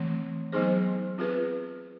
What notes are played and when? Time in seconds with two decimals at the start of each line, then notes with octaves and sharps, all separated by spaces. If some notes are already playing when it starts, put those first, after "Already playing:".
Already playing: E3 A3 C4
0.52 F#3 B3 D#4 G#4 C5
1.18 C4 F4 G#4 B4